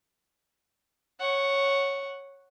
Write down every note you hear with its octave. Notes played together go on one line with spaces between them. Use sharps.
C#5 F#5